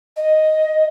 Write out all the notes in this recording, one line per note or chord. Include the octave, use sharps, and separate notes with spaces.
D#5